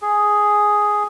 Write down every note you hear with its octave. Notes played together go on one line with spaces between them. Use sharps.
G#4